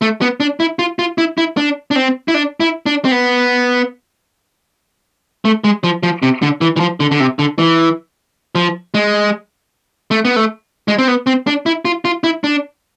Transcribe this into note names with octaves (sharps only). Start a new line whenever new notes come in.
A3
B3
D4
E4
F4
F4
E4
E4
D4
D4
C4
E4
D4
E4
D4
C4
B3
A3
G#3
F3
F3
C3
D3
E3
E3
F3
D3
D3
C3
D3
E3
F3
G#3
A3
B3
A3
G#3
C4
B3
C4
D4
E4
F4
F4
E4
D4